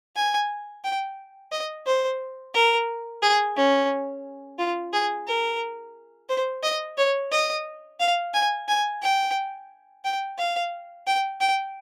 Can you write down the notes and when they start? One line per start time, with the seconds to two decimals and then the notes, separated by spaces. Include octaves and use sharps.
0.16 G#5
0.84 G5
1.52 D#5
1.86 C5
2.55 A#4
3.22 G#4
3.57 C#4
4.59 F4
4.93 G#4
5.27 A#4
6.29 C5
6.63 D#5
6.98 C#5
7.32 D#5
8.00 F5
8.34 G#5
8.68 G#5
9.02 G5
10.05 G5
10.38 F5
11.07 G5
11.41 G5